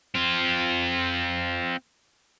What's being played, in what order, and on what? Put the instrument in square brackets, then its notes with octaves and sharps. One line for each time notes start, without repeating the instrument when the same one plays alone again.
[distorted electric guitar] C4 F4